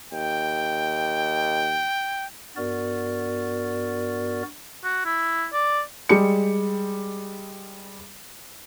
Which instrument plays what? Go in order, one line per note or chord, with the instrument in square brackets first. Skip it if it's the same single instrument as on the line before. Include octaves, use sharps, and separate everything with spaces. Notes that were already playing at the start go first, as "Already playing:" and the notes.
[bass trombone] D#2 [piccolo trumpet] G5
[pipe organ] G2 B3 F#4 A#4 D5
[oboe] F#4
E4
D5
[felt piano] G3 G#3 C#7